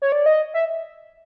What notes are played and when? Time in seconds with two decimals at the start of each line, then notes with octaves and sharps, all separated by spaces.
0.02 C#5
0.12 D5
0.26 D#5
0.54 E5